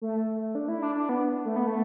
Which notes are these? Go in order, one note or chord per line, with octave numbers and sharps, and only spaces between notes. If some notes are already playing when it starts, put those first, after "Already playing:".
A3
D4
E4
D4
D4
B3
A3
B3
A3